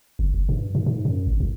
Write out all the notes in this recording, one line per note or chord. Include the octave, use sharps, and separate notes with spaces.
F#1
F#1
G2
G#2
G#2
F#2
G#1
C2